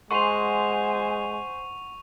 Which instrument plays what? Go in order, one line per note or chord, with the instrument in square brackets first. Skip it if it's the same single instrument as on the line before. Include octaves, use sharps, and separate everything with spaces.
[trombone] G#3 [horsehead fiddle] C5 G#5 [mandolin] F#5 C6 [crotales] C#6 D#7 F7